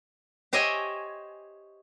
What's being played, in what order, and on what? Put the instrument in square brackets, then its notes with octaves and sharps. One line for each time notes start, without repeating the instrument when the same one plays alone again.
[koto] G4 C5 C#5 D#5 E5 G#5